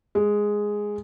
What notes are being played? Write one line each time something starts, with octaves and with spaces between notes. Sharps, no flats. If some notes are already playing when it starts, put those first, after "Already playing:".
G#3